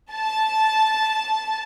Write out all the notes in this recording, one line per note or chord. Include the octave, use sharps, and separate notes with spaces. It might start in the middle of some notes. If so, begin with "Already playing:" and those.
A5